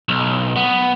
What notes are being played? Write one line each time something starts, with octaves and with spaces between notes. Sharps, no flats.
B1
B3